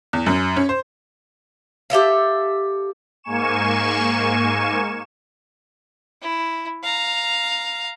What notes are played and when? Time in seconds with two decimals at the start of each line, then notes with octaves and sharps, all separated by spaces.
0.13 E2
0.26 F#2
0.56 C#4
0.69 C5
1.90 G4 A4 E5 F5
3.23 G#2 A#3 G#5 C#6 E7
6.22 E4
6.83 F5 A#5